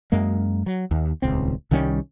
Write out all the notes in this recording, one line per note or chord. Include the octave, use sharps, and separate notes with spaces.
F#2 G#3 A#3
F#3
D#2
D#1 C#2 C4
C2 D#3 G3 C#4